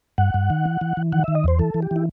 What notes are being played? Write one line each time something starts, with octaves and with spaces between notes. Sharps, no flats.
G2 F#5
G2
D#3
E3
E3
E3
D#3 F#5
D#3 E5
D#5
E2 C5
E3 A4
E3
G4
E3
E4